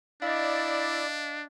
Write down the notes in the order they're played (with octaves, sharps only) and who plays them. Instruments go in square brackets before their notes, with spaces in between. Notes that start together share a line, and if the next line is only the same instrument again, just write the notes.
[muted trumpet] D4 [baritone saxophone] E4 [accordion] D5 [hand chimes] D#5 F5